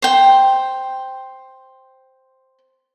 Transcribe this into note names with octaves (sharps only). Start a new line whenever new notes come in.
C5 G5